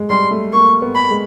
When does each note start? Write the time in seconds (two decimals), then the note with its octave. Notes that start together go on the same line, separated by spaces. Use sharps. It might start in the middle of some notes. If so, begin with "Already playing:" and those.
Already playing: G#3
0.10 G3 C6
0.31 A3
0.53 A#3 C#6
0.82 B3
0.95 B5
1.10 G#3